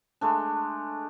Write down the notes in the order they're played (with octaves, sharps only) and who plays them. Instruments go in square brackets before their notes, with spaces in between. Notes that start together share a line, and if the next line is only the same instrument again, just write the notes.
[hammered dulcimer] G#3 A3 D4